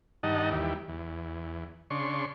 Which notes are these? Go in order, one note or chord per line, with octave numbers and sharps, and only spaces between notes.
G2 D#3 D#4 D#5 F#5 A5
D#2 E3 G3
E2
C#3 D4 C6 C#6